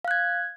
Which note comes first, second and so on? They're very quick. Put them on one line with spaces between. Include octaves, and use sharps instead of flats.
F5 F#6 G#6